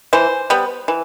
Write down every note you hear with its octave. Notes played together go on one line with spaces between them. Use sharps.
E3 C5
G3 B3
E3